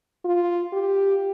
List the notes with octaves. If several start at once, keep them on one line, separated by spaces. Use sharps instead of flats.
F4
G4